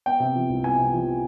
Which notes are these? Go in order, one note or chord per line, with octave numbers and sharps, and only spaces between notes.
B3 G5
C3
F3
C2
B3 G#5
C3
F3